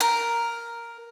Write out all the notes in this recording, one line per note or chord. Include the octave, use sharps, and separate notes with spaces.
A#4